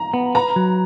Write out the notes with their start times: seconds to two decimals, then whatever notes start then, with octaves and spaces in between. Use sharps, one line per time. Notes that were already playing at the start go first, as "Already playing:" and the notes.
Already playing: A#5
0.14 B3
0.35 B4 A#5
0.56 F#3